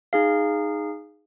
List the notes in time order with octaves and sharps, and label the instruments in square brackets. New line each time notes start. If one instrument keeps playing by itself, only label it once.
[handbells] D#4 G#4 F5